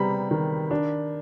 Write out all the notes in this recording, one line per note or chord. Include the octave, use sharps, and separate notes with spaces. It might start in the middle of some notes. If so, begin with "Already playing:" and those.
Already playing: C3 G3 B3 A#5 B5
D#3
D4